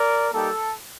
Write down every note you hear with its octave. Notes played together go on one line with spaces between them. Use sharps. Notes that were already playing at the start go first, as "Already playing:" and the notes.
Already playing: A#4 D5
G3 A#3 D#4 G4 A4